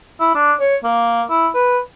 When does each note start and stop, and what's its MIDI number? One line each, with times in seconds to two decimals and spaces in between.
0.20 0.33 64
0.35 0.52 62
0.60 0.76 73
0.84 1.22 58
1.30 1.48 64
1.54 1.78 71